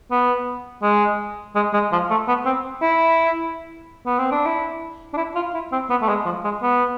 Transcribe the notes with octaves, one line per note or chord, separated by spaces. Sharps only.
B3
G#3
G#3
G#3
F3
A3
B3
C4
E4
B3
C4
D4
E4
D4
E4
F4
E4
C4
B3
A3
G#3
F3
G#3
B3